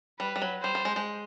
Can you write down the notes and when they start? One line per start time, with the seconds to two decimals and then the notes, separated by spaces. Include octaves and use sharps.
0.20 G3 B4
0.36 G3
0.42 F#3
0.63 G3 C5
0.75 G3
0.85 G#3
0.96 G#3